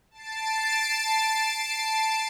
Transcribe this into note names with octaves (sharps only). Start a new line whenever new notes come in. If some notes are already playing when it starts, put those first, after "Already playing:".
A5 A6 C7 D7